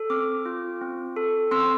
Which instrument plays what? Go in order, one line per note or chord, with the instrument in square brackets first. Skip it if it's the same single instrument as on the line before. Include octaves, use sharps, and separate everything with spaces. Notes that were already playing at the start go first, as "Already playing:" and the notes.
Already playing: [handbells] A4
C4 D6 F6
F4
C4
A4
C4 C6 E6